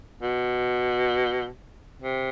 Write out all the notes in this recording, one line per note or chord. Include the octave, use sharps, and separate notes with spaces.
B2
C3